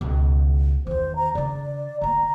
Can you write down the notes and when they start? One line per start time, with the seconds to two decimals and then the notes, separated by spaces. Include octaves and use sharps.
0.01 C#2 B2
0.87 E2 D#3 C5
1.16 A#5
1.35 C#3 D4 D5
2.01 D3 A#3 A#5